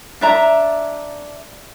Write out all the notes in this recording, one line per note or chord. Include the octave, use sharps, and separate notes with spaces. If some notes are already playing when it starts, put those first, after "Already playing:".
D4 E5 A#5